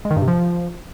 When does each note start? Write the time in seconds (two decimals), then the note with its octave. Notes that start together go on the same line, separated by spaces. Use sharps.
0.05 G#3
0.11 D#3
0.16 G2
0.22 C3
0.28 F3